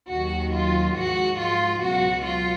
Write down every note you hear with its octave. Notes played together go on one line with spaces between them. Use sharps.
D#2 D#3 F#3 F#4
F4
G#2 F3 F#4
F4
C#2 B2 F#3 F#4
F4